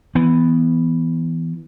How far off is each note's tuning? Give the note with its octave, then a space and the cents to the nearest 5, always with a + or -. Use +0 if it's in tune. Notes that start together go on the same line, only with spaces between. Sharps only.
E3 +0 B3 +5